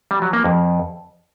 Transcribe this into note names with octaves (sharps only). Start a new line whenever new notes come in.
G3
F#3
A#3
F2